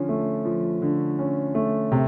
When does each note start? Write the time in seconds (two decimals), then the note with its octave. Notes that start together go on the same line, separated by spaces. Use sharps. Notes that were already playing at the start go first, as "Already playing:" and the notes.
Already playing: D3 F3 C#4
0.09 A3
0.45 F3
0.82 D3
1.19 C#4
1.55 A3
1.92 C3